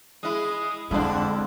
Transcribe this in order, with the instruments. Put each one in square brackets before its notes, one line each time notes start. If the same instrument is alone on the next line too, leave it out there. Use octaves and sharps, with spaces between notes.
[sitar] G#3 E4 [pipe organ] D#6
[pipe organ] F2 D3 [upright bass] G#3 [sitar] D4 E4